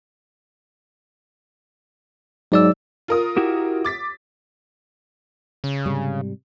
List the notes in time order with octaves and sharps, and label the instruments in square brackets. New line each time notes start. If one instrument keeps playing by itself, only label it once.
[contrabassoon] G#2 [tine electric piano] F#3 D5 E6
[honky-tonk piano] F4 A#4 D#6
[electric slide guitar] E4 F#4 G4
[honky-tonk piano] D6 A6 B6
[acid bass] C#3
[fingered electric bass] G#2 C3 G3